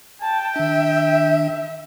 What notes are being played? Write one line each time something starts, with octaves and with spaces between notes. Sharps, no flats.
G5 A5
D#3 D4 E5